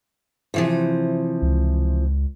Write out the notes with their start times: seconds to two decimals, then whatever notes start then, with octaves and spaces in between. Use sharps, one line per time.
0.54 C3 E3 F3
1.42 C#2